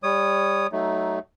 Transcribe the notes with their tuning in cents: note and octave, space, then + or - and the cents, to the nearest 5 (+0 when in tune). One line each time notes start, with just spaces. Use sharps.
G3 +20 C#5 +5 D#6 -15
F#3 +25 A3 +0 D#4 +0